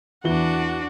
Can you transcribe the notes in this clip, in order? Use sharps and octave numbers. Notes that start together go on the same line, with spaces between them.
E2 E3 D4 F#4 G7